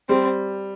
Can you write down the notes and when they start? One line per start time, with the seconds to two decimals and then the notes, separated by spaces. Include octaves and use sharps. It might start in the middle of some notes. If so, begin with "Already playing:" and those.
0.09 G3 C4